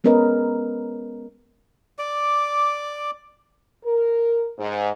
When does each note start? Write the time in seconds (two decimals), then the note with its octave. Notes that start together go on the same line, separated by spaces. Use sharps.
0.04 G#3 B3 C#4 A#4 B4 D#5
1.99 D5 D6
3.84 A#4
4.58 G#2